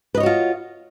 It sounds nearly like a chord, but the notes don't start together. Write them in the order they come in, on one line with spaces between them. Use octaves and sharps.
B4 D#5 C#5 F#4 F4